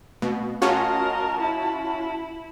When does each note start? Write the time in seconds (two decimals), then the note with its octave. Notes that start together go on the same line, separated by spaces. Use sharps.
0.22 B2 A3
0.62 C#4 F4 F#4 A#4 D#5 A5
1.41 E4